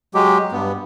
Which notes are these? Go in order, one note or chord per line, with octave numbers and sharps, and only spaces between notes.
F#3 G#3 G4
G2 B3